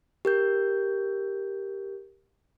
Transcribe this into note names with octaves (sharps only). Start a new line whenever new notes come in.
G4 A#4 G6